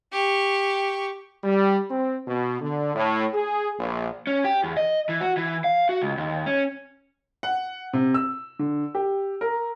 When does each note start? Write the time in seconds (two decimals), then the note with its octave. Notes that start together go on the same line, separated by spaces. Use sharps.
0.12 G4 C#6
1.44 G3
1.90 C4
2.27 B2
2.61 D3
2.95 A2
3.34 G#4
3.79 A#1
4.27 C#4
4.44 G4
4.64 E2
4.77 D#5
5.09 E3
5.21 F#4
5.37 E3
5.64 F5
5.89 F#4
6.01 C#2
6.18 D#2
6.46 C#4
7.43 F#5
7.93 C3
8.14 E6
8.59 D3
8.95 G4
9.41 A#4